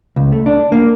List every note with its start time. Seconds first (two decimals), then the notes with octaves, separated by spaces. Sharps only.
0.16 C#2
0.32 A3
0.46 D4
0.72 A#3